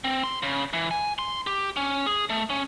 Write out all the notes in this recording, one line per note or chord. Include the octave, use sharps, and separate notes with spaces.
C4
C6
C#3
E3
G#5
C6
G4
C#4
G#4
A3
C#4